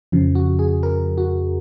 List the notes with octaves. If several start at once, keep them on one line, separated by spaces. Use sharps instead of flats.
F2 C#3 F3
F#4
G#4
A#4
F#4